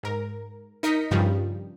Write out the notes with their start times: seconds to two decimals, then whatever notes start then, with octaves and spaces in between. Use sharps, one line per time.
0.03 G#2 A#4
0.83 D#4 A#4 D#5 B6 C#7
1.11 G2 C#3 F3 G3